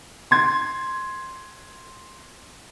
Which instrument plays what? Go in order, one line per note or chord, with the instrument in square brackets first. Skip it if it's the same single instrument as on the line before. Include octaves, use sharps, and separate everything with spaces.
[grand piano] C6 G#6